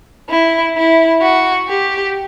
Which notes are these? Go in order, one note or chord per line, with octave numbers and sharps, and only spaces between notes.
E4
E4
F#4
G4